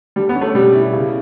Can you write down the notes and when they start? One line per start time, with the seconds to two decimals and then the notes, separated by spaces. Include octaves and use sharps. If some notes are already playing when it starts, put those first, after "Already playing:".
0.16 D3 G3
0.29 B3
0.35 C#4
0.41 A3
0.54 B2 G3
0.74 E4
0.93 C#3